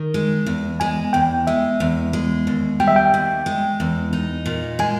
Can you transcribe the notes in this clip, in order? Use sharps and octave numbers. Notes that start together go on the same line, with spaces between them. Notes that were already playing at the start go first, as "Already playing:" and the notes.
Already playing: D#3
G#3
E2
G#3 G#5
E2 G5
G#3 E5
E2
G#3
D#2
G3 G5
E5
G5
D#2
G#3
E2
D#4
A#2
G#3 G#5